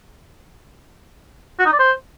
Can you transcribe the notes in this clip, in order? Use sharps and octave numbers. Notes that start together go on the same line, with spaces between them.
F#4
D#4
D5
C5